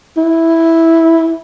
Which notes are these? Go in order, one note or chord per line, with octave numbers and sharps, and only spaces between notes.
E4